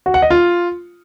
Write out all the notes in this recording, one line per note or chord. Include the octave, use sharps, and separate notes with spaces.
F#4
F#5
D#5
F4